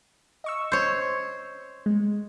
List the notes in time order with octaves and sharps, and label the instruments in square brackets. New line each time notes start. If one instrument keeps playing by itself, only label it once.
[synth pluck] D#5 C#6 E6
[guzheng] C5 C#5
[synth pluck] G#3